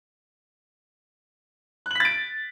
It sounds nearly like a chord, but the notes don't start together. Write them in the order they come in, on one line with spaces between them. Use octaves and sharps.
F#6 F#7 B6 A6 D7